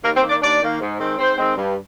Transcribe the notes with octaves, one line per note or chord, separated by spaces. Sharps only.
D#2 A#3 A#4
C4 C5
D#3 A#3
D4 D5
D#2 D4 D5
D#3 A#3
G#2
D#3 G#3 C4
G#2 C4 C5
D#3 G#3 C4
G2